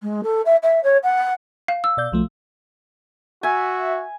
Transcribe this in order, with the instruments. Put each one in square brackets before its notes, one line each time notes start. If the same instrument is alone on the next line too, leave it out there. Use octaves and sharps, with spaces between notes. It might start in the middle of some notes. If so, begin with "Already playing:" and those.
[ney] G#3
A4
E5
E5
C#5
F#5
[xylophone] F5
E6
[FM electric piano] B2 D5 G6
B1 F3 A3
[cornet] F#4 [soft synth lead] E5 [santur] G#5